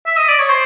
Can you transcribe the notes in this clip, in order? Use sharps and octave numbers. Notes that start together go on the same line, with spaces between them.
E5
D#5
D5
C#5
C5